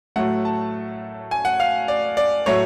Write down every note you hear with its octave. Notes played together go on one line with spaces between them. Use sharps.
A2 F#3 A3 F#5
A5
G#5
F#5
F5
D5
D5
A2 F#3 A3 C#5